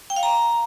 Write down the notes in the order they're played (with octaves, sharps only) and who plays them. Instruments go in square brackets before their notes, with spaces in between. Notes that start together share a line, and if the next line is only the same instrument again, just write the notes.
[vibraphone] G5
F5
A#5